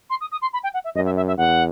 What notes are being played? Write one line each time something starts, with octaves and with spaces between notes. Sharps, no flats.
C6
D#6
D#6
C6
B5
G5
F#5
E5
F#2 D#5
E5
E5
E5
E2 F#5